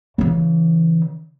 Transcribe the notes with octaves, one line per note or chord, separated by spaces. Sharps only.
C#3 E3